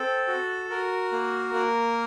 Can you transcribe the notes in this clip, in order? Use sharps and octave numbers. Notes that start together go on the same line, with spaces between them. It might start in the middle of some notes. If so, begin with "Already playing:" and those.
Already playing: C4 A4
F#4
F#4 A#4
A#3
A#3